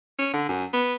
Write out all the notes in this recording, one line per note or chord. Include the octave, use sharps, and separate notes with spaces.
C#4
D3
F#2
B3